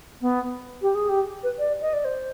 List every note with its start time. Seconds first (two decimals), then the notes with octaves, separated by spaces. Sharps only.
0.21 B3
0.82 G4
0.95 G#4
1.09 G4
1.43 B4
1.59 D5
1.81 D#5
1.93 D5
2.05 C5